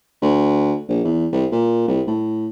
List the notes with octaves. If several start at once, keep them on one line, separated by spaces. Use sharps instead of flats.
D2
A#1
E2
C2
A#2
C2
A2